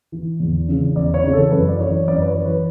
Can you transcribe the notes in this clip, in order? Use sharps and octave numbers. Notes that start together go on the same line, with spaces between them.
E3
E2
C#3 E3
E2 D5
C#5
C#3 E3
A4
F#2 B4
D5
E3 C#5
F#2 D5
B4
C#5
E3
B4